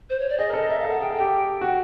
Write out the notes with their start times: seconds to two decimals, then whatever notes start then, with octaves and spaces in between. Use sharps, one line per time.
0.10 C5
0.19 C#5
0.29 D5
0.38 G#4 D#5
0.49 A#4
0.53 A4
0.69 A#4 E5
0.80 A4 F5
0.90 F#5
1.00 G#4 G5
1.10 A4
1.15 G4 G5
1.61 F#4 G5